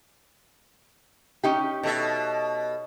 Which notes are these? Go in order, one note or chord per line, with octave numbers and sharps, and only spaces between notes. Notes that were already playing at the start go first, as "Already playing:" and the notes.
C#4 D#4 G4
B2 A4 E5